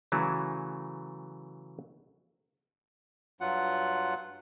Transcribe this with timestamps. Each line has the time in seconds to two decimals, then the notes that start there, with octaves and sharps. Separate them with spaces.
0.12 C#3 E3 F#3 A3
3.41 G2 F#3 F4 F#5